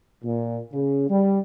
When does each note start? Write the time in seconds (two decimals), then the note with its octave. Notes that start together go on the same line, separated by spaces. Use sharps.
0.23 A#2
0.73 C#3
1.09 G3